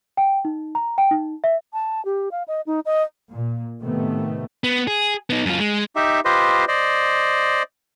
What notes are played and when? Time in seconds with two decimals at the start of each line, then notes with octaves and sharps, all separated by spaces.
0.17 G5
0.45 D#4
0.75 A#5
0.98 G5
1.11 D#4
1.44 E5
1.73 A5
2.05 G4
2.31 F5
2.48 D#5
2.66 D#4
2.85 D#5
3.31 A#2
3.81 A2 C3 D#3 A3 B3
4.64 B3
4.88 G#4
5.30 B3 D#4
5.46 F#2 F4
5.59 G#3
5.96 D#4 G4 E5
6.25 F4 G4 B4 C5 D#5
6.68 C5 D5 D#5